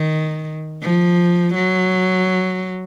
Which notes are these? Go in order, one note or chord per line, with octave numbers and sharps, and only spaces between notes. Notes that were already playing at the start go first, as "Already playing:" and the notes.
Already playing: D#3
F3
F#3